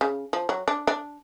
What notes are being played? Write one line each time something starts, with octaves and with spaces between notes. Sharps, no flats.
C#3
F3
F#3
D4
D4